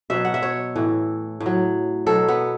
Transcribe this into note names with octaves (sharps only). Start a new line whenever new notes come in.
B2 F#3 E5
F#5
E5
C#5
A2 E3
A2
F#3
B2 F#3 A4
B3